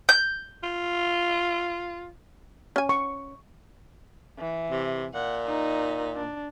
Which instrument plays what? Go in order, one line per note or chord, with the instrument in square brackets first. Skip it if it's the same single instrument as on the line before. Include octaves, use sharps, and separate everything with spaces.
[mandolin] G6
[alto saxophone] F4
[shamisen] C#4 G#5
[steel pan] C#6
[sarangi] E3
[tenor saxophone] C3
[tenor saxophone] A#2 [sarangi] F#5
[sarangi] D#4
D4